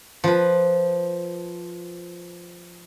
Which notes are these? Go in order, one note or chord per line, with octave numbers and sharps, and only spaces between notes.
F3 B4